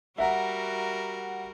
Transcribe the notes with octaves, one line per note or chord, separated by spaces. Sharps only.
G3 F#4 A#4 E5 F#5 A#5